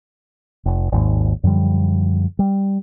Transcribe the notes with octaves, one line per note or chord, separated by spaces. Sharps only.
F1
G#1 D#2 G#2
F#2 D3 F3 G3
G3